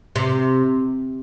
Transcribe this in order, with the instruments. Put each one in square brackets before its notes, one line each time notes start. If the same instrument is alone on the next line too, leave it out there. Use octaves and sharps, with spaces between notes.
[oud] C3